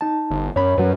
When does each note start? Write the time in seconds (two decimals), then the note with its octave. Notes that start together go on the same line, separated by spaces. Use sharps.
0.01 D#4 A5
0.31 G1
0.56 F#2 C#5 B5
0.78 F#2 F#3 B4